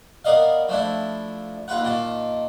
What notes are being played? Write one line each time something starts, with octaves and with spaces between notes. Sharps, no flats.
B3 A#4 D5 D#5 F5
F3 A3 D4 E4
D#2 F4 B4 F#5
A#2 D#3 F4 A5